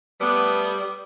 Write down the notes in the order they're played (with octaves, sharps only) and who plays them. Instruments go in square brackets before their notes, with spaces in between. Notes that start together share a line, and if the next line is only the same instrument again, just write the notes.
[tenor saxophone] G3 [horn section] A3 B3 [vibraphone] D6 D#6